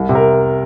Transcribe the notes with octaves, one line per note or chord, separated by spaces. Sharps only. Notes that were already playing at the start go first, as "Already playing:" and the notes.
Already playing: C2
C3
A#4